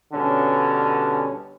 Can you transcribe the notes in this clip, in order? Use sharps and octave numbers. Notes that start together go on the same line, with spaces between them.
G2 B2 D3 C#4